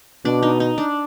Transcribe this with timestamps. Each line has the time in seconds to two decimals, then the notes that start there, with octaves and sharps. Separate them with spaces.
0.25 B2 D4
0.43 D#4
0.60 D#4
0.78 D4